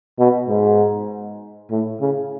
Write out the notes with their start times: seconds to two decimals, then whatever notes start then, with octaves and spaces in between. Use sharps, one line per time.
0.19 B2
0.48 G#2
1.70 A2
2.01 C#3